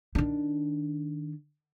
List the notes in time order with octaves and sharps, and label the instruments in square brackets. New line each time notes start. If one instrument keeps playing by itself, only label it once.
[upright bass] D#3 D4